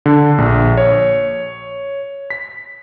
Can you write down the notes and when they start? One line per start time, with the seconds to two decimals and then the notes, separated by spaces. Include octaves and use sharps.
0.06 D3
0.38 A#1
0.77 C#5
2.30 B6